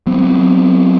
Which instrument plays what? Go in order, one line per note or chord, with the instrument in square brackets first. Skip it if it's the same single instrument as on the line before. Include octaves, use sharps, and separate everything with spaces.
[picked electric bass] F#3 B3 C4